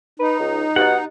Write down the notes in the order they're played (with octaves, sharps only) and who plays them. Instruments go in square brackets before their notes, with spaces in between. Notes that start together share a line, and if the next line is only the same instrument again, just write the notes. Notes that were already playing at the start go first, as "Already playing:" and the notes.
[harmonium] D#4 [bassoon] B4
[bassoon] C#2
[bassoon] B2 [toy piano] G4 D#5 [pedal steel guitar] F#5